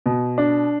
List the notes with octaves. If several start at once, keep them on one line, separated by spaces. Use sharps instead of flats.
B2
D4